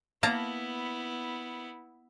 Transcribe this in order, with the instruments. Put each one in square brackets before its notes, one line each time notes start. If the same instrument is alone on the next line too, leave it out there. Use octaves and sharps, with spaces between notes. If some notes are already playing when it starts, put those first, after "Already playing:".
[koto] A#3 A5 A#5 [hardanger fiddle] B3 E4